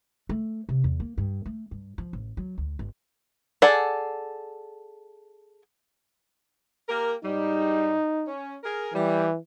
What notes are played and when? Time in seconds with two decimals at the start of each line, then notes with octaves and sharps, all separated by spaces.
0.29 A3
0.69 C3
0.84 E2
1.00 A#3
1.18 G2
1.46 A3
1.71 G2
1.98 F3
2.13 A1
2.37 F#3
2.58 D2
2.79 G1
3.62 G#4 A4 D5 F#5
6.89 A#3 G4 A#4
7.24 G#2 G3 D#4
8.27 C#4
8.64 G#4 A#4
8.94 E3 G3